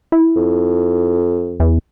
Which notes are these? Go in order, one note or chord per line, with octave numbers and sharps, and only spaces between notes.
E4
F2
E2